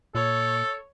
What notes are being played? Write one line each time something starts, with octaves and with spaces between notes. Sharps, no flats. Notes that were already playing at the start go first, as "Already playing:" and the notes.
A#2 A4 C#5